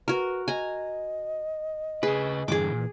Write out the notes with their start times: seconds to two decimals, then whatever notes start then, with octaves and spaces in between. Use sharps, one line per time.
0.08 F#4 A#4 B4
0.48 D#5 G#5 A#5
2.03 C#3 G#4 B4
2.48 G2 D3 E3 G#4 D6
2.72 A#2 E3